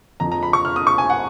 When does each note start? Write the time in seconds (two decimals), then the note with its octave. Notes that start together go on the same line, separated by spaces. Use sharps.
0.20 F2 F3 A#5
0.32 A#5
0.43 B5
0.53 C#6
0.65 F6
0.76 D#6
0.87 C#6
0.98 G#5
1.10 F#5